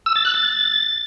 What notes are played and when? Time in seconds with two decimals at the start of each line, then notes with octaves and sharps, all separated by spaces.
0.06 E6
0.16 A6
0.25 F#6
0.34 A6